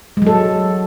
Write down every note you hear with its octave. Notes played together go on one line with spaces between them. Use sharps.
F#3 G#3 A4